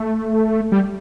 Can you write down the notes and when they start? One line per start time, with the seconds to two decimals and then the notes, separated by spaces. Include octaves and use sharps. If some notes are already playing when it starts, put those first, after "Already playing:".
Already playing: A3
0.72 G3